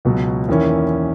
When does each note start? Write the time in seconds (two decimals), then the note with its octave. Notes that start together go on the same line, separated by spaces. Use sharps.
0.05 C#2 B2 F#3
0.49 E2 D#3 A#3 C#4 E4